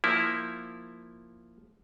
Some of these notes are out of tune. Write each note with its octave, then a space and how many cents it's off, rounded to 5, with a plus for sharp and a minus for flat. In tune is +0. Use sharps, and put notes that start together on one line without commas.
F3 +0 A#3 +0 E4 +0